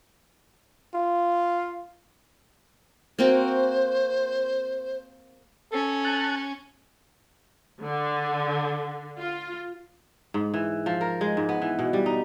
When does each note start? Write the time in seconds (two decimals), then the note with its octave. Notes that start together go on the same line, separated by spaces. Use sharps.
0.94 F4
3.19 A#3 C4 F#4 C5
5.72 C#4 A4
6.05 A5 F#6
7.83 D3
9.18 F4
10.34 G#2
10.54 E3
10.86 F3
11.01 A#4
11.21 G#3
11.37 G#2
11.49 B3
11.62 E3
11.79 B2
11.93 G3
12.06 D#4